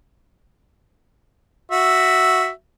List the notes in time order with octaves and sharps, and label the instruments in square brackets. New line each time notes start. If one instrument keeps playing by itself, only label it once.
[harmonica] F#4 E5